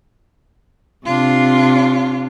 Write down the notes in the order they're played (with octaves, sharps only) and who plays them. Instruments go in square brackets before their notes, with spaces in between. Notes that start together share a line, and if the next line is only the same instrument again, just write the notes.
[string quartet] C3 [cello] D4 F4